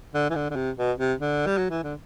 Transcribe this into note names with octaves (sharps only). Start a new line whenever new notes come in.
D3
E3
D3
D3
C3
B2
C3
D3
G3
F#3
E3
D3